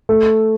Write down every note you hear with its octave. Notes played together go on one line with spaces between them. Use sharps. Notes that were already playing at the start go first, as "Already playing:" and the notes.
A3